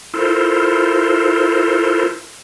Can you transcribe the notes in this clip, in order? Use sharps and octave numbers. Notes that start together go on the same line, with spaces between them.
E4 F4 A4 A#4 C5